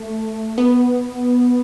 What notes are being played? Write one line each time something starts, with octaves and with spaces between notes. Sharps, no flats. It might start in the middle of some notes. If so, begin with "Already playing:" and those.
Already playing: A3
B3